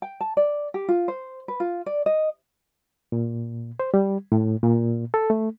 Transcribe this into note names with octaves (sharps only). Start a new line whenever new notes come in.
G5
A5
D5
G4
F4
C5
B4
F4
D5
D#5
A#2
C5
G3
A2
A#2
A4
A3